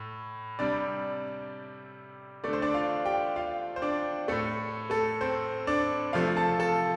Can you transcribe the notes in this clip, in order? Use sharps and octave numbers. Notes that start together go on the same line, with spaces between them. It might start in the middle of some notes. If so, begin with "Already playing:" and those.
Already playing: A2
C3 G3 D4 D5
D3 A3 D5
C5
D4 D5
F4 F5
G4 G5
F4 F5
C5
D4 D5
A2 A3 A4
A3 A4
C4 C5
D4 D5
C3 F3 A3 F4 F5
A4 A5
A4 A5